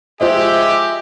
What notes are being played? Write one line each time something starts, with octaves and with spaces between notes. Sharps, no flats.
G#3 F4 G4 C5 D#5 E5